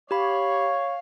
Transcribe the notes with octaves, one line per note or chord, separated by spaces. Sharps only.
G4 C#5 F5 B5